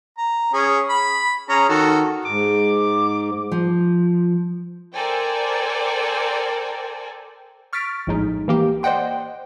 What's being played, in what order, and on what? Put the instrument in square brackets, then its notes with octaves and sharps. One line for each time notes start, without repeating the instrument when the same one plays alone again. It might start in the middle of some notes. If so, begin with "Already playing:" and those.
[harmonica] A#5
C#4 G#4
B5
C#4 G#4 A#5
D#3 F#4 A4
[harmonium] G#2 [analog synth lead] D6
[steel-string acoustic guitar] F3
[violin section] A4 A#4 C5 D5 G5 G#5
[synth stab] C#6 F6 A6 B6 D7
A#1 A2 G#3 D#4
E3 A#3 G4
C5 D5 D#5 F#5 G5 C6